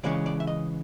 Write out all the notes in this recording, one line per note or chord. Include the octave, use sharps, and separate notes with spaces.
C#3 E3 G#3 C#4 D5
D5
E5
D#5